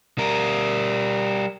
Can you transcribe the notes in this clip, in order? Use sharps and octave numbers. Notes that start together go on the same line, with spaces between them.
G3 A#4